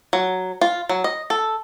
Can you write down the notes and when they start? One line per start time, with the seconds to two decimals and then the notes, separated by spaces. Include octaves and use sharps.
0.13 F#3
0.61 F4
0.89 F#3
1.04 D#5
1.30 A4